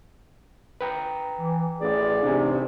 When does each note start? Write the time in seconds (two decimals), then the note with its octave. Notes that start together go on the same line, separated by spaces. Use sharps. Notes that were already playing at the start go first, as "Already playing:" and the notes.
0.81 B4 G5 A#5
1.39 E3
1.80 A1 G#4 D5
2.23 A1 C3 D4 D#4 G#5